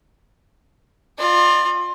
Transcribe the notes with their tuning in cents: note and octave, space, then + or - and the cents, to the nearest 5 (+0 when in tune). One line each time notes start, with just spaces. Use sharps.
F4 +15 D5 +45